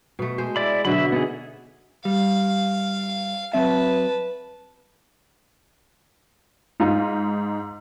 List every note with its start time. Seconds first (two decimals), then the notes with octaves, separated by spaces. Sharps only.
0.19 B2 A3
0.38 G#3 C5
0.56 E4 D5 B5
0.85 B2 D3 F#3 E5 B5
1.12 B3 D#4 G#4
2.05 G3 F5
3.53 F#3 C4 B4 E5 A5
6.80 G#2 D#4 F4